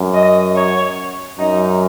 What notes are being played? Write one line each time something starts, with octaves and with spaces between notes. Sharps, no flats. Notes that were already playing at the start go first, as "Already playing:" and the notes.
Already playing: F#2
D#5
C#5
F#2 D#4